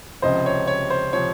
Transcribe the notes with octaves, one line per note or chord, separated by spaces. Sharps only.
C#2 C3 F3 C5 D#5
C#5
C#5
C5
C3 F3 C#5